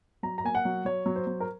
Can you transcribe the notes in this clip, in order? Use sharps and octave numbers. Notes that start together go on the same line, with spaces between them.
F#3 A#5
A#5
A#3 G#5
F#5
F#3
F#3 C#5
F#3
C5
F#3
A#4